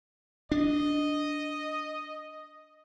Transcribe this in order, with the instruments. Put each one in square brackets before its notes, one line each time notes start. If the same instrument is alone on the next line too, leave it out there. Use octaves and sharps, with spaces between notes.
[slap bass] D4 [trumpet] D#5